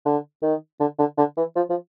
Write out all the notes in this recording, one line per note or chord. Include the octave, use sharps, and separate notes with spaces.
D3
D#3
D3
D3
D3
E3
F3
F3